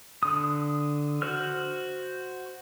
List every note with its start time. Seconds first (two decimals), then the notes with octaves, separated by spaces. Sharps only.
0.23 D3 D#6
1.22 F#4 C5 F6